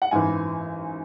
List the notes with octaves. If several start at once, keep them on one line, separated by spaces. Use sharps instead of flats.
F#5
G#1 F#2 E3 E5 G#5